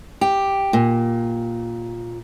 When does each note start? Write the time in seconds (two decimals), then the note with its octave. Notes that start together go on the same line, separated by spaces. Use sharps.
0.21 G4
0.73 A#2